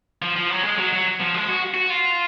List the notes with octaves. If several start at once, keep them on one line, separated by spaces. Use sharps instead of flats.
F3
F3
F#3
G#3
F#3
F#3
F3
G#3
F#4
F#4
F4